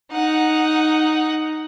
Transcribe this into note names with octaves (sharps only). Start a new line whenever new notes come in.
D#4 F#5